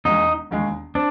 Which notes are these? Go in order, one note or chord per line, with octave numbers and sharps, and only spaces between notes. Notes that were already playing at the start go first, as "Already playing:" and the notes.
E1 D#2 D#3 G#3 D#4
E1 D#2 D#3 G#3
C4 D4